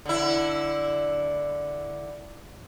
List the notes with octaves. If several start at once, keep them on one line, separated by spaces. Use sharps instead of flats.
D3 E4